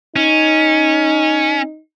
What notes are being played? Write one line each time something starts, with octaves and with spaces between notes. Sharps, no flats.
C#4 D#4